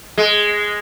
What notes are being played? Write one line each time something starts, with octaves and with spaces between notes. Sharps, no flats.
G#3